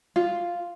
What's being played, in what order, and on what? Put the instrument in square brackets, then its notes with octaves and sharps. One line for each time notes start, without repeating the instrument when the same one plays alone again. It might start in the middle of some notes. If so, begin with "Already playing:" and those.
[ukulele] F4